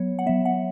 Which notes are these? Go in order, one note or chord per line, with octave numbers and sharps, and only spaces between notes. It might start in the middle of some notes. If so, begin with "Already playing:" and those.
Already playing: F#3 B3 C#5
F#5
F#3 B3 E5
F#5